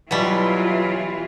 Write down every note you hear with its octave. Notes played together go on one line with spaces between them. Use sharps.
B2 E3 F#3 G3 E4 F4